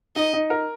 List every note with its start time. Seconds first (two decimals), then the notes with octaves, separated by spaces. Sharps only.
0.16 D#4 D#5
0.33 D#4
0.50 A#4